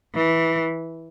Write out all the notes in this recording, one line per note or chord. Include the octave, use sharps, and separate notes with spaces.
E3